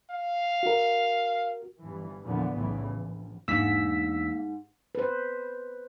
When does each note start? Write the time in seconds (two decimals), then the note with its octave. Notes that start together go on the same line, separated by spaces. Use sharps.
0.10 F5
0.63 F#4 A#4
1.81 G1 G2 E3
2.22 E2 A#2 D3 E3 F3 B3
2.53 B1 E2 A2 C#3 E3
2.88 A#1
3.48 E2 G#2 A#3 D4 E6 B6
4.95 B4 C5